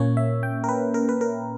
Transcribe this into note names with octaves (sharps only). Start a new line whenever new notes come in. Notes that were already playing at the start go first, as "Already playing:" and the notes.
Already playing: A#2 A#3 C#4 C#5
E5
G5
A#4
B4
A#4
B4
A#4